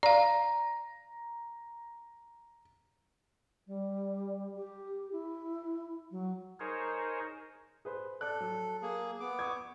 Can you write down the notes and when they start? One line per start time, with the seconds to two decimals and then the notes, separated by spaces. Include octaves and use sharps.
0.03 D5 F5 A#5
3.67 G3
4.56 G4
5.12 E4
6.11 F#3
6.60 D#4 G#4 A#4 C5 C#5
7.85 G#4 B4 C5
8.21 A4 D5 F#6
8.41 F#3
8.82 A#3 G#4
9.20 B3 D6
9.39 C#6 D#6 G#6